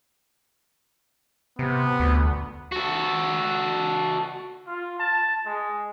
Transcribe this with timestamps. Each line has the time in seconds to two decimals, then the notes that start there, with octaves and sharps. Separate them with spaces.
1.59 C3 B3
2.00 D2
2.72 F#4 A4
4.67 F4
4.99 A5
5.46 G#3